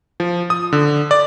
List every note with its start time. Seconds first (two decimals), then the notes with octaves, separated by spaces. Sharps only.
0.20 F3
0.50 D#6
0.73 D3
1.11 D5